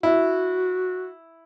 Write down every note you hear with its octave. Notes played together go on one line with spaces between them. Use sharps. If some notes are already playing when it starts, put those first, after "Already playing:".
E4 F#4